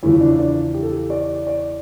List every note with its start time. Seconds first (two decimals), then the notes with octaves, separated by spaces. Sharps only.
0.03 E2 C#3 F3 E4
0.21 D4
0.39 D4
0.74 G4
0.83 A4
0.91 G4
1.10 D5
1.47 D5